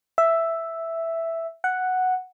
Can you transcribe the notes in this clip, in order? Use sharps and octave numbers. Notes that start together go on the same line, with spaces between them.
E5
F#5